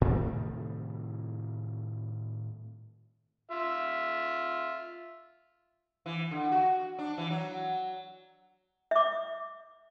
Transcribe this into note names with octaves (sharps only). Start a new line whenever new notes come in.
A2 C3 D#3 G3
F4 E5
E3
D3
F#4
D4
E3
F#3
E5 D6